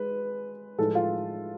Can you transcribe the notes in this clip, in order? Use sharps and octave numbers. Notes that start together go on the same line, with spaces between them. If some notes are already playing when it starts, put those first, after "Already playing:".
Already playing: G#3 B4
A2 F3 G#3 A4
F4